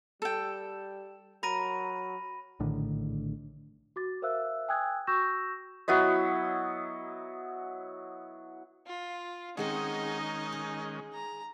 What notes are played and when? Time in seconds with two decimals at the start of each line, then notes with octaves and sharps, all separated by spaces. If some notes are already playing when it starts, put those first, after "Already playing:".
0.22 G3 A4 G5
1.43 F#3 A#4 B5 A#6 D#7
2.60 A#1 A2 D3 D#3
3.96 F#4 D6 A6
4.22 A#4 C5 E5 F5 E6 F#6
4.68 G5 G#5 D#6 E6 F#6 G#6
5.07 F#4 C#6 E6 G6 A#6 E7
5.88 F#3 B3 E4 D#5
8.86 F4
9.57 D#3 G#3 C4 C#4 D#4 G#4 D#5 F#5
10.52 G#4
11.13 A#5